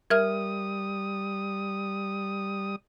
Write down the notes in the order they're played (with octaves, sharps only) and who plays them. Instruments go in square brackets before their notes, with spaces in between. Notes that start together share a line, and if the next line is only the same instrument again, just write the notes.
[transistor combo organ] G3 D#6 [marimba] A#4 E5 F6